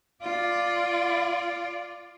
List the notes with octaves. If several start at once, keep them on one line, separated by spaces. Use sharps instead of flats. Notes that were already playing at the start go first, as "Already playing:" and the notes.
F4 D5